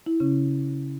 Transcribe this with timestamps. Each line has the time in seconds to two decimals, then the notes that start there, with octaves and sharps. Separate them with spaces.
0.06 E4
0.20 C#3 C#4